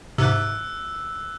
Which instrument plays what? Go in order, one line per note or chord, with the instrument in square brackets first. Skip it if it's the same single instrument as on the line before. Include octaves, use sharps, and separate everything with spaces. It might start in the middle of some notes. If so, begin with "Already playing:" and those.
[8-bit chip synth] G#2 C3 [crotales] E6 F#6